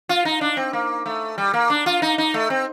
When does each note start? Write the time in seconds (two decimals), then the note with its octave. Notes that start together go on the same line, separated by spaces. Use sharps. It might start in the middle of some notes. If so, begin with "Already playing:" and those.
0.09 F4
0.25 D#4
0.41 D4
0.57 C4
0.73 A#3
1.06 A3
1.38 G3
1.54 A#3
1.70 D4
1.86 F4
2.02 D#4
2.18 D#4
2.34 A3
2.50 C4